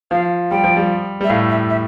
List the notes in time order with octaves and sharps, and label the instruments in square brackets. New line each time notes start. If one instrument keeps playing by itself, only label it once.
[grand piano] F3 [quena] F5
[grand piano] G3 [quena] G5
[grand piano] F3
G3
[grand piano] G3 [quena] E5
[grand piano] A2 A3 [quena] F5
[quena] E5
E5